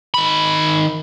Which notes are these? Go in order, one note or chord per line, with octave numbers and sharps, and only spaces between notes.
D#3 B5